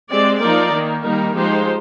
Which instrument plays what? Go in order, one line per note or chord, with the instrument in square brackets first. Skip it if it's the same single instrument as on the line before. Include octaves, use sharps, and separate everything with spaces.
[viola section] G#3 C4 G4 D5
F3 A#3 D#4 A#4 D5
D#3 A#3 D#4
D#3 G3 A#3 D#4 A#4
F3 G#3 D#4 G4 C5